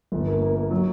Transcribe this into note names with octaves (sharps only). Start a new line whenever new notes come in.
G1
A#3
A#3
A#3
F#3